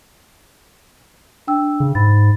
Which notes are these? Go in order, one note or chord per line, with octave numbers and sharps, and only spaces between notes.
D4 G5 E6
C#3
G#2 B5 A6